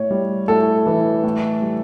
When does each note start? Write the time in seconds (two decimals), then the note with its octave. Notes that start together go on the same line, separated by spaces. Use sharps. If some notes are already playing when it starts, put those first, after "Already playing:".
Already playing: A2 C#5
0.11 G3
0.48 A2 A4
0.86 E3
1.24 A2
1.62 G3